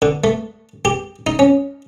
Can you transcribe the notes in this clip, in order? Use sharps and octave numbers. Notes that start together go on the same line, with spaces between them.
D3
A3
G4
D#4
C#4